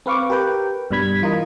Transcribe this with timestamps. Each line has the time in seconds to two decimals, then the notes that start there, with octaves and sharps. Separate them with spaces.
0.06 C4 B4 F5 C#6 D6
0.30 G4 A#4 B4 G5
0.91 G2 B2 G3 B5 G#6 B6
1.22 E3 F4 A#4 D#5